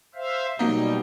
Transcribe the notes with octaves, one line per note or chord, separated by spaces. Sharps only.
C5 E5 F5
B2 F#3 G3 A#3 D#4